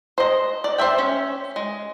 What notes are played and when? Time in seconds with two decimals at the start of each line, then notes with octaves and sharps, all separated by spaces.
0.18 C5 D#5
0.64 D5
0.78 C5 D5 E5 G5
0.98 C#4
1.56 G#3